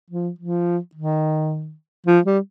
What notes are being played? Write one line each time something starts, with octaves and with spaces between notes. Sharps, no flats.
F3
F3
D#3
F3
G3